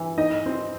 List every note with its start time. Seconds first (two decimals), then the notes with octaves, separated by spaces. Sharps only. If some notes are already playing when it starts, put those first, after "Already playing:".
Already playing: E3
0.18 D#4 D#5
0.46 C4